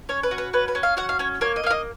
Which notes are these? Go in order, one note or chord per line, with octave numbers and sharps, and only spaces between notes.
C#4 C#5
B4
F#4
B4
C#4 B4
B4
C#4
F5
F#4 F#5
F5
C#4 C#5
A#3 C#5
D#5
A#3 F5
D#5